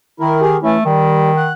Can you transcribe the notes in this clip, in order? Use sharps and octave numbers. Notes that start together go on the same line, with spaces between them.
D#3 E4 A#4
G4 G#4 A#4
E3 A3 C#4 E4
D#3 G3
F#5